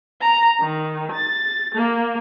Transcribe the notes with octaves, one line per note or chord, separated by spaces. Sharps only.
A#5
D#3
A6
A#3